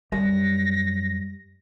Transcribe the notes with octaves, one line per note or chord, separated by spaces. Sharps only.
F#2 G3 A#6